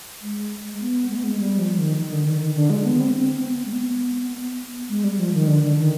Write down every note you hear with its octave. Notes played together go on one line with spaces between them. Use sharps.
G#3
B3
G#3
B3
G#3
G3
F3
D#3
D#3
D3
D#3
D#3
D3
G#3
B3
C4
C4
B3
G#3
B3
G#3
G3
F3
D#3
D3
D#3